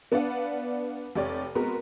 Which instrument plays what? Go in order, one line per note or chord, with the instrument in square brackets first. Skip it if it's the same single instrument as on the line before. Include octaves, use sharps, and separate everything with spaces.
[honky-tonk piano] B3 D4 B4 D5 F5 F#5
F1 C3 G4 C#5 D5
G#3 B3 C4 F#4 A#4